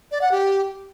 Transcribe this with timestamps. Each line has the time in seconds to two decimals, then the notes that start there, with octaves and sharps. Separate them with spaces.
0.11 D5
0.21 F#5
0.32 G4